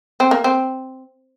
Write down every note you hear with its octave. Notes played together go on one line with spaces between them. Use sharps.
C4
A#3
C4